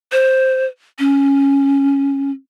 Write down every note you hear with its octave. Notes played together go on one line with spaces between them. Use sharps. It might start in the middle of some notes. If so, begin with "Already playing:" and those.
C5
C#4